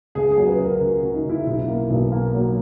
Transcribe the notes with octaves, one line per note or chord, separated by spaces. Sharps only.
C#2 G#4
G#4
F#3
B4
C#2 A#4
C#2 F#4
F#4
C#2
D#4
C#2 E4
B1 E4
A#3
B1
A#3
F#3